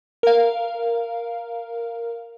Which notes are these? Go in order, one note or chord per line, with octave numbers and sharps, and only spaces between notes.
A#4 F5